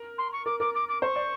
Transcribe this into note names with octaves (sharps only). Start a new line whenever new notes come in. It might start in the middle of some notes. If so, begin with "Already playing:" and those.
Already playing: A#4
C6
C#6
A#4 D6
A#4 D6
D6
D6
C5 C#6
D5